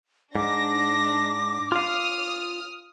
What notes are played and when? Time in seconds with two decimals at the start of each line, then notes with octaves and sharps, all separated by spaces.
0.35 G#2 D4 D6 A#6
1.72 F4 F5 D#6 F6